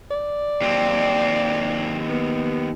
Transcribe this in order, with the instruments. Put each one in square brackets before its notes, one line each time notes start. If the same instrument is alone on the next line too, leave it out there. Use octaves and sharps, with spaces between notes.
[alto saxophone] D5
[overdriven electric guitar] D#2 C4
[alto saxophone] B3